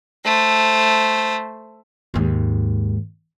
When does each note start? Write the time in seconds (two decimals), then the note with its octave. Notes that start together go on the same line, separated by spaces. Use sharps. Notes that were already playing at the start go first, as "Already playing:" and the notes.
0.25 A3 C5
2.14 D#2 G#2